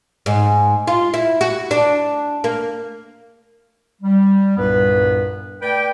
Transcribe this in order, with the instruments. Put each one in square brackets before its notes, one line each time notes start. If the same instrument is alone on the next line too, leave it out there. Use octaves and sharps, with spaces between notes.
[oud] G#2
F4
E4
F#4
D4
A#3
[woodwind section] G3
C2 G2 A#2 B3 B4
A3 B4 D5 G5